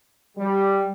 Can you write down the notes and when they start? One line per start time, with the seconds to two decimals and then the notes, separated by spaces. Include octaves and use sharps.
0.38 G3